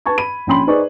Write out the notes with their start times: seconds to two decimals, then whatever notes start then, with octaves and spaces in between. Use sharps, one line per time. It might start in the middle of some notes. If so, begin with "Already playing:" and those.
0.06 B4 A5 C#6 G#6
0.18 B5 D#7
0.47 A#1 C#4 G5 B5 C6 F#7
0.67 D#4 G#4 B4 C5 D5 C#6